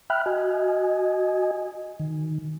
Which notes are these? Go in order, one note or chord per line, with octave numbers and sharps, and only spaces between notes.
E5 G5 B5 F6 F#6
F#4 D#5 G#5
D#3